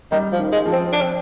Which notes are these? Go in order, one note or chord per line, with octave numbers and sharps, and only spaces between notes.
D#3 G3
F3
D#3
G#3
F3
C4
D4
C4